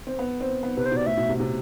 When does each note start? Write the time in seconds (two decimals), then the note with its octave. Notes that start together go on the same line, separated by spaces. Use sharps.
0.07 C4
0.19 B3
0.41 C4
0.63 B3
0.76 C3 B4
0.86 C5
0.91 B2
0.97 D5
1.06 A2 E5
1.17 B2
1.29 C3
1.40 C3